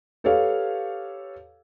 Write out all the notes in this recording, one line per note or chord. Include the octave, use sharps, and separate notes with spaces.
G4 A4 B4 C#5 F5